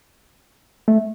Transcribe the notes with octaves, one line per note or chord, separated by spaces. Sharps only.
A3